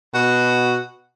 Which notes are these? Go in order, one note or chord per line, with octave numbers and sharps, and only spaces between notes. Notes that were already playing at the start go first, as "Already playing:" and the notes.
B2 F#4